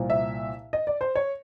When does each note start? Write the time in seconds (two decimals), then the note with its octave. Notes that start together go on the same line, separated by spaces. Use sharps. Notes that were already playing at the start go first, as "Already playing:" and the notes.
Already playing: C2 A#2 F3
0.10 E5
0.73 D#5
0.87 D5
1.01 C5
1.15 C#5